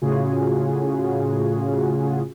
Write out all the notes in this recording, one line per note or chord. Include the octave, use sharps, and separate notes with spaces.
A2 C#3 F4 F#4 G#4